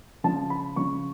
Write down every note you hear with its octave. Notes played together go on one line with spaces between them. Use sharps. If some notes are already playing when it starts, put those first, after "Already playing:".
C#3 F3 A5
B5
C#3 F3 C#6